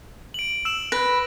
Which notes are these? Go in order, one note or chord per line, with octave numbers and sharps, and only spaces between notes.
D7 F#7
E6 E7 F#7
B4 A#6